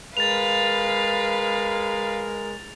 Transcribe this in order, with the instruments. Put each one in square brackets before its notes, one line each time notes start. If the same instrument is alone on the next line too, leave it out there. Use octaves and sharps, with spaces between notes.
[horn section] G#3 A#4 [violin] B4 F5 [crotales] A6 F7